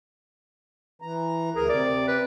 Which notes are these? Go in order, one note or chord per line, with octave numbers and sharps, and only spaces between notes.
E3 A#5
D2 G#4 A#4 A#5
C3 D5
B4